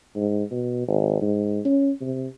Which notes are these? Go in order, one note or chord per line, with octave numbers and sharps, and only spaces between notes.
G#2
B2
G#1
G#2
C#4
C3